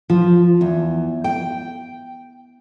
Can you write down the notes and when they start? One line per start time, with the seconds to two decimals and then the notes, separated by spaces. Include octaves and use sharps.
0.10 F3
0.61 E2
1.24 G5